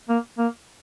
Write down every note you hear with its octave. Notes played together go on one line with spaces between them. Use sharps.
A#3
A#3